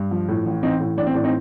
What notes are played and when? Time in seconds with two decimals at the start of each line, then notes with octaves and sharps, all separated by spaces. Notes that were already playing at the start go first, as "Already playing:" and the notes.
Already playing: G2
0.11 F3
0.28 A2
0.46 A1
0.63 A1 C4 D#4
0.80 A2
0.98 A1 D4
1.07 C4
1.15 A2 D4
1.24 C4 D#4